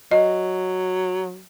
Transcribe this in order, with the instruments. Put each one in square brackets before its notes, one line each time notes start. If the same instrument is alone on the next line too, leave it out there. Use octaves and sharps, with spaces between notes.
[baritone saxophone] F#3 [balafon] D#5